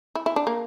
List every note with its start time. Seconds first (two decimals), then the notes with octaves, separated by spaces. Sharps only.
0.15 E4
0.26 E4
0.36 D4
0.47 A#3